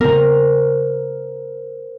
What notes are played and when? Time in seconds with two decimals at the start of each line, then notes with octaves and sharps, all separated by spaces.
0.01 C#3 B3 C4 A#4